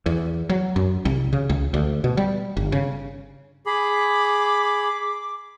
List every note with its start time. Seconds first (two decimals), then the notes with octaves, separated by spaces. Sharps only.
0.06 E2
0.49 F#3
0.76 F#2
1.05 C2
1.33 C#3
1.49 C#2
1.74 D2
2.04 B2
2.17 G3
2.57 G1
2.72 C#3
3.66 G#4 B5 D6